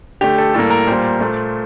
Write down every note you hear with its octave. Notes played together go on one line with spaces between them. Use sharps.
D3 A3 G4
A4
A2 G3 A#3 A4
A#4
A#2 G3 A#3 C5
A#2 A3